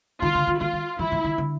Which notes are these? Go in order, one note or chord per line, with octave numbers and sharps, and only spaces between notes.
D#3 F4
D3
D#3
D#3 F4
D#3
E3 E4
E3
D#3
D3